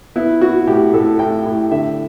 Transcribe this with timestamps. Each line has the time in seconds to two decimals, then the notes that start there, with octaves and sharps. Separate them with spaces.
0.16 B3 E4
0.41 B3 F#4
0.67 A2 G4
0.93 A2 A4
1.19 A2 G5
1.45 A2
1.71 D3 E5